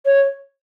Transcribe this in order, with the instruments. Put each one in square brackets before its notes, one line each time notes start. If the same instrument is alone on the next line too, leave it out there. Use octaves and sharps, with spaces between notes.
[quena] C#5